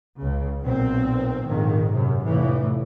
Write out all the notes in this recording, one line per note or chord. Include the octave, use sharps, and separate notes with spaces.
C#2 C#3
B1 A#2 C4
A#1 F2 G#2 D#3
F#2 C3
F1 A2 E3